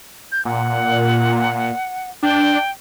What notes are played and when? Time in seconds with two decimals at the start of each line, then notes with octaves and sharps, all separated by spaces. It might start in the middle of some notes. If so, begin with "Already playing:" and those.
0.32 G6
0.45 A#2 F#5
2.23 D4 G5